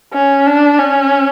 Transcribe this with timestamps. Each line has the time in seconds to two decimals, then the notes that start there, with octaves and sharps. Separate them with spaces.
0.13 C#4
0.47 D4
0.79 C#4